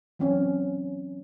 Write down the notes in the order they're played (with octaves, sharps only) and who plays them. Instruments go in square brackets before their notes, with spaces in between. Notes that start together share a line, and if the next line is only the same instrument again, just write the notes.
[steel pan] E3 F#3 C4 C#4